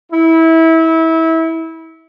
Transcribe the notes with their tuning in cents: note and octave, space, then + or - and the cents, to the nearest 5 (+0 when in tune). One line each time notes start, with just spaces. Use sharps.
E4 -25